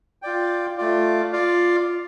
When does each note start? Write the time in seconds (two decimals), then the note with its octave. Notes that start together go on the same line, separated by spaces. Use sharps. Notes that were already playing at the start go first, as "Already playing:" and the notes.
0.22 F4 D5 G5
0.78 A3 F4 D5
1.33 F4 D5 F5